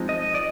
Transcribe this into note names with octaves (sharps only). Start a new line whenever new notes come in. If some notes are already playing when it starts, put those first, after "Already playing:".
Already playing: F3 G#3 C4 D#4
D#5
D5